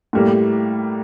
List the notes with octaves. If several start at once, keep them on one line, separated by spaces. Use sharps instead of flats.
A2 G3 A#3